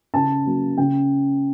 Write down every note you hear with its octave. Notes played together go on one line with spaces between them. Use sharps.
C#3 A5
F#3 A#3
C#3 G5